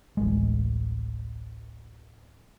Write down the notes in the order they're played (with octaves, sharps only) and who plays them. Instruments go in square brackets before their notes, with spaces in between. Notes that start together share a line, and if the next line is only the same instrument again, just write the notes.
[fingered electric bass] D1 A1 G#3